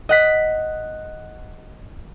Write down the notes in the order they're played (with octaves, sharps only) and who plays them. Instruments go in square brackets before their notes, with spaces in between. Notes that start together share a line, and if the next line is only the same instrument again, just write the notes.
[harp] D#5 F#5 B6